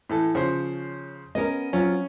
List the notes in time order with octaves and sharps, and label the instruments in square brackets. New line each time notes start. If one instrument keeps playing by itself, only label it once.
[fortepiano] A2 E3 A4
[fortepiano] C#3 F3 C5 [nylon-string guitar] C#5
[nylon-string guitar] B3 C#4 A#4 [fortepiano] D#5
[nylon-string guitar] F#3 C4 F4 [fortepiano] C#4